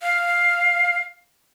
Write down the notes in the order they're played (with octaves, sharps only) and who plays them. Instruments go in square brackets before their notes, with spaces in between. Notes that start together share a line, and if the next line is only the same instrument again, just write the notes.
[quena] F5